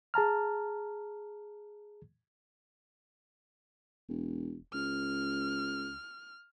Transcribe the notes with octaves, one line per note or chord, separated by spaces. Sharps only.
G#4 A5 A#5 F6
E1
C#2 F6